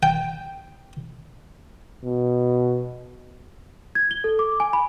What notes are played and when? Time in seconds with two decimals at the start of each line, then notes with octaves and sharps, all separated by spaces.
0.03 G5
2.04 B2
3.95 G#6
4.11 G7
4.24 A4
4.39 D6
4.60 G#5
4.73 B5